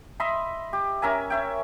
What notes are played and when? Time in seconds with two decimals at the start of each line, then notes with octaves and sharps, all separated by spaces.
0.20 D#5 E5 B5 C6
0.73 G4
1.02 C#4 A#4 E5 G#5
1.30 C#5 E5 G5